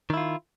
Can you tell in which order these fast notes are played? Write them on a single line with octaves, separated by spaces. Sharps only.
D#3 E4 F4